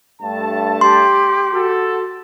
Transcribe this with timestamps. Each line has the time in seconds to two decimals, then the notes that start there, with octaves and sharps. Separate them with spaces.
0.22 G2 A3 A5
0.81 G4 C6
1.54 F#4 A4